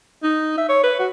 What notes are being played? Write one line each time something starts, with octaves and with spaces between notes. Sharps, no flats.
D#4
E5
C#5
B4
F#4